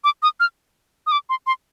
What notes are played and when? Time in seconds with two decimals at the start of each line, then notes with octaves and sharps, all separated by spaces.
0.04 D6
0.23 D#6
0.40 F6
1.07 D#6
1.12 D6
1.29 C6
1.47 C6